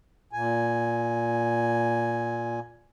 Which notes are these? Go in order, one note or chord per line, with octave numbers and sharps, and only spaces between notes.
A#2 G#5